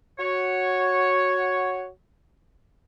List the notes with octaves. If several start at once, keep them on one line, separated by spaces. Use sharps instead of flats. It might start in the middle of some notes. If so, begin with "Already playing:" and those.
F#4 C#5